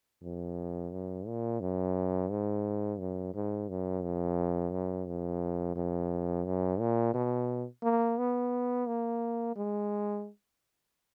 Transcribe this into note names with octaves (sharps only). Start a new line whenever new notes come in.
F2
F#2
A#2
F#2
G#2
F#2
G#2
F#2
F2
F#2
F2
F2
F#2
A#2
B2
A#3
B3
A#3
G#3